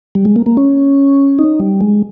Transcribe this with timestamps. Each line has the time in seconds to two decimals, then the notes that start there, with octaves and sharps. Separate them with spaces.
0.15 G3
0.25 G#3
0.36 A#3
0.46 A#3
0.57 C#4
1.39 D#4
1.60 G3
1.81 G#3